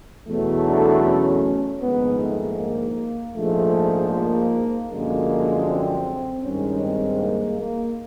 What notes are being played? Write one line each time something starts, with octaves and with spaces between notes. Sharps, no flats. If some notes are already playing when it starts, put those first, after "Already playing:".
E2 B2 F#3 A3
D4
C#4
A#1 G#2 D#3 B3
A3
A#3
A#1 G#2 F3 G#3 A3
A#3
F#2 D3 F3 G#3 A#3
C4
G2 D#3 G#3 C#4
C4
A#3
A#3